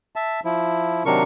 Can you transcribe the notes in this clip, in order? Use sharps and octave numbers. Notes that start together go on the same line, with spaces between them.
E5 A5
F3 E4
C3 D#3 F#3 D4 A#4 C#6